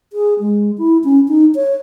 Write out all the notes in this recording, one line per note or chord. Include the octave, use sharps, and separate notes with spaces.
G#4
G#3
E4
C#4
D#4
C#5